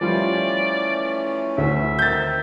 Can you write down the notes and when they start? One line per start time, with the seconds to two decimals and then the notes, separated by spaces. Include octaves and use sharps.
0.01 E3 F3 G3 A3 C#4 F4 D5
1.58 D2 E5
1.99 D#3 C4 D#4 G6 A6